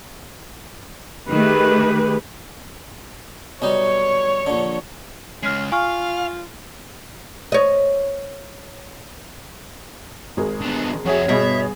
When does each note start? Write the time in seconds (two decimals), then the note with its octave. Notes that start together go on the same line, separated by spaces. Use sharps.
1.28 D#3 A3 G4 G#4 B4
3.62 B1 G3 D#4 C#5
4.47 A#1 D3
5.43 C#3 G#3 C#4 F6 B6 C7
5.72 F4 F5 G#5 C#6 F6
7.52 C#5 D#5
10.37 G#1 G#4 A#4
10.61 D3 B3
11.05 F2 F#4 G#4 C#5 E5
11.29 G2 B2 G#4 E5